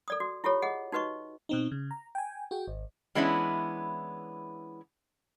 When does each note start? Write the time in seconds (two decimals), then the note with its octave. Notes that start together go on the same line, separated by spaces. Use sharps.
0.08 A4 D5 D#6
0.20 F#4
0.44 E4 F4 G4 A4 C#5
0.62 G#4 D#5 F#5
0.92 D#4 F#4 B4 D#5 C#6
1.49 B2 C4 D#4
1.72 C#3
1.91 A#5
2.15 G5 G#5
2.51 F#4 G#4 G5
2.67 G#1
3.15 E3 G#3 B3 C#4 D4 E4